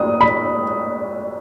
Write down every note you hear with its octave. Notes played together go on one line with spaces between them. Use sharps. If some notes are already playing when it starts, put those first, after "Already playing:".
Already playing: D#6
B5